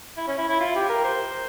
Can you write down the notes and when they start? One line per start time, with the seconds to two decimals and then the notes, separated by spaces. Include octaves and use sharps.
0.17 E4
0.27 C#4
0.38 E4
0.49 E4
0.60 F4
0.75 G4
0.89 A#4
1.04 C5